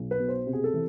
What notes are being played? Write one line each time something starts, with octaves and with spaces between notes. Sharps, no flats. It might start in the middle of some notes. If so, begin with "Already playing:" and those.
Already playing: B1
B4
B2
C5
C3
G#4
A4
E3